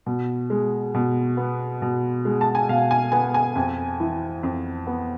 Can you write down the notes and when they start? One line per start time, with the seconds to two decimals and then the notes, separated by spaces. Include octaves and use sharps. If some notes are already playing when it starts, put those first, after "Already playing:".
0.06 B2
0.50 G#3
0.94 B2
1.37 B3
1.82 B2
2.25 G#3
2.41 A5
2.55 G#5
2.69 B2 F5
2.91 G#5
3.12 B3 G#5
3.34 G#5
3.55 F2
4.00 E3
4.43 F2
4.87 B3